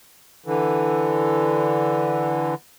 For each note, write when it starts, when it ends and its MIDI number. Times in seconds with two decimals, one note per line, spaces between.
0.46 2.54 50
0.46 2.54 52